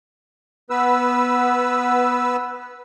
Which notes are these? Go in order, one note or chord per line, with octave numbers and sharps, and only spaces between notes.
B3 B4 E6